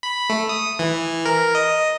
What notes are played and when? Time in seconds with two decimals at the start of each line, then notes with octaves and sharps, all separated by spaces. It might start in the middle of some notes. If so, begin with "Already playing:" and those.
0.03 B5
0.30 A3
0.49 D#6
0.79 E3
1.26 A#4
1.55 D#5